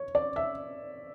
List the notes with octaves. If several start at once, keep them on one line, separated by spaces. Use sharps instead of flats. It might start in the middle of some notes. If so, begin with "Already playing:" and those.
Already playing: C#5
D5
E5